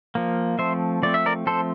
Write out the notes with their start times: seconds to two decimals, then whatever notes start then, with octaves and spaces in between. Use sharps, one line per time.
0.15 F3 A#3
0.59 F3 A3 C4 C5 E5
1.03 F3 A3 C4 D5
1.14 E5
1.26 A#4 D5
1.46 F3 A3 C4 A4 C5